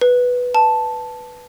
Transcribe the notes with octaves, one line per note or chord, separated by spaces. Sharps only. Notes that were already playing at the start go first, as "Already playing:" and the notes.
B4
A5